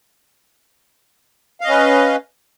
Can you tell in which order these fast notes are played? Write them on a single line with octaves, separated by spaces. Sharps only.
F5 D#5 C#4 B4